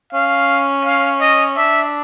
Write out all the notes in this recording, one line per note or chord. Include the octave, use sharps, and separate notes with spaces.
C#4 F5
F5
D#5
D4 E5